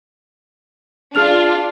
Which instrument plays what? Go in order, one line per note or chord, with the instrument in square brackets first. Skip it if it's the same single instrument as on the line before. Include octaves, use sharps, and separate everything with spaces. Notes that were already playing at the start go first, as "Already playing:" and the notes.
[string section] D4 F4 [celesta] G#4 F6 F7